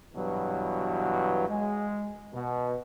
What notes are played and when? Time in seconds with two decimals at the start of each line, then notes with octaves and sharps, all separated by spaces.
0.14 G2 B2 E3 F#3
1.49 G#3
2.33 B2